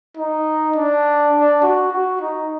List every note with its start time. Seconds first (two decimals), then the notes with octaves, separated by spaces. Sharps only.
0.17 D#4
0.76 D4
1.33 D4
1.62 F#4
1.92 F#4
2.21 D#4